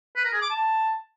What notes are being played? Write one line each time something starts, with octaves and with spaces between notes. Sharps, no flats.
B4
A#4
G#4
D6
A5